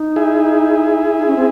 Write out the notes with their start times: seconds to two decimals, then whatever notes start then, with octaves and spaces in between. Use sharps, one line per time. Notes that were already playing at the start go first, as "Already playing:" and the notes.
Already playing: D#4
0.16 E4 G#4
1.17 D#4
1.27 C#4
1.36 C4